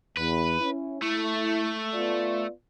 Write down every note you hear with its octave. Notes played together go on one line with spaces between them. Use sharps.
E2 B4
C#4 E4
A3 E4
B3 F4 D5